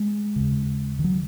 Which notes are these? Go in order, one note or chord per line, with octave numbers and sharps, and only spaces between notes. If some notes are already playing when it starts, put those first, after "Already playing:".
Already playing: G#3
D#2 C#3
D#3
F#3